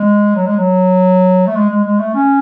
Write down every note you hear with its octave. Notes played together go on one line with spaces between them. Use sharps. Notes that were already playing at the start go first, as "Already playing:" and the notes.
Already playing: G#3
F#3
G#3
F#3
A3
G#3
G#3
G#3
A3
C#4